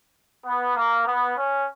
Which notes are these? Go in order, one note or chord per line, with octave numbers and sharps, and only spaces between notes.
B3
A#3
B3
C#4